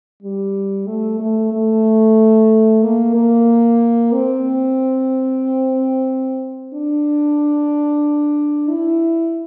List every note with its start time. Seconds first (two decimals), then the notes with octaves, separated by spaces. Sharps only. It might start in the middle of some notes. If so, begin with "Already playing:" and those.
0.23 G3
0.87 A3
1.20 A3
1.52 A3
2.83 A#3
3.15 A#3
4.13 C4
6.74 D4
8.69 E4